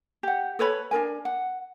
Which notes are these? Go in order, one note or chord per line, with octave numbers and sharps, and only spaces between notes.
G4 F#5
A4 B4 C#5 B5
D4 D#4 A#4 G#5
F#5